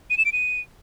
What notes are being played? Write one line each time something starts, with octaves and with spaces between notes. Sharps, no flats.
D#7
E7
D7
D#7